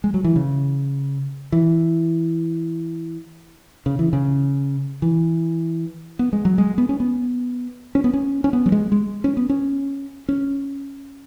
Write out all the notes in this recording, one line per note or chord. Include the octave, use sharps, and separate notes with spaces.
G#3
F#3
E3
C#3
E3
C#3
E3
C#3
E3
B3
G#3
F#3
G#3
B3
C#4
B3
C#4
B3
C#4
C#4
B3
F#3
G#3
G#3
C#4
B3
C#4
C#4